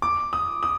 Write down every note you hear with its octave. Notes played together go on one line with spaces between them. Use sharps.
D6
D#6
D#6